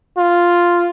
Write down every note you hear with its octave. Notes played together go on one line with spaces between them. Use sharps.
F4